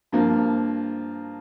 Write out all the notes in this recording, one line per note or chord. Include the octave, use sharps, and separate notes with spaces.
G2 F3 A#3